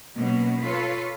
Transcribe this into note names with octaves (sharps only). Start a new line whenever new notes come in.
B2 F#3 A#3 B3 C#4
F4 A4 B4 C#5